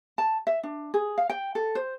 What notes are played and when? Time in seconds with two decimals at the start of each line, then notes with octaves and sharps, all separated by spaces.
0.18 A5
0.47 E5
0.63 D4
0.94 G#4
1.18 F5
1.30 G5
1.55 A4
1.75 C5